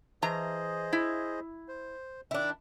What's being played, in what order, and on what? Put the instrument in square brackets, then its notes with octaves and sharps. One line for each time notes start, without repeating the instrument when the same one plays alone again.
[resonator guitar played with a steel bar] E3 A#5 [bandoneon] G#4 C5 D#5
[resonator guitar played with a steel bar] E4
[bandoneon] C5
[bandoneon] D#3 [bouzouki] D4 E4